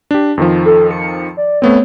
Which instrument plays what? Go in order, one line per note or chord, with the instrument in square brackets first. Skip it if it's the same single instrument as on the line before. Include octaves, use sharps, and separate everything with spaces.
[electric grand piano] D4 G4
F2 D#3 F3
[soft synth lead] A4
C#7
D5
[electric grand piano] A3 B3 C4 [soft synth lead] C#5